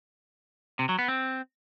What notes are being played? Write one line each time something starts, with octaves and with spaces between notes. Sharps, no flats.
C3
F#3
B3
C4